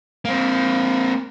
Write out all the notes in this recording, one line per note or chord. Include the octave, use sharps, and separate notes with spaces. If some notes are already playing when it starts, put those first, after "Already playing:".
A#3 C4